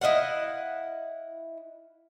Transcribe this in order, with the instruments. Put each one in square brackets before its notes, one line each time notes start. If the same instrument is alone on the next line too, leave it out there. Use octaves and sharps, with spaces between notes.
[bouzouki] E4 D#5 F5 F#5